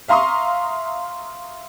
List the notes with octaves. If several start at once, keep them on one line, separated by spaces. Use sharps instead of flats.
E5 F5 A#5 C6 C#6 D#6